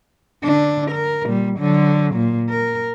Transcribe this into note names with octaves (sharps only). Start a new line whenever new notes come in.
D3 D4
A#4
A#2 G3
D3 F#3
A#2
A#4